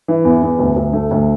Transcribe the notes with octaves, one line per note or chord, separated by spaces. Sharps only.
E3
E2
E2
D2
D2
A3
D2